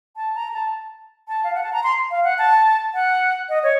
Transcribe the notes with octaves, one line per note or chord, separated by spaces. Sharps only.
A5
A#5
A5
A5
F5
F#5
A5
A#5
C6
F5
F#5
A5
F#5
D#5
C#5